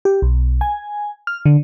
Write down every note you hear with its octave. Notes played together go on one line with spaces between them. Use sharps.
G4
B1
G#5
F6
D3